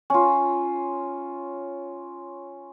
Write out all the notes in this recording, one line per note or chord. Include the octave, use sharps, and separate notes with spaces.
C#4 F4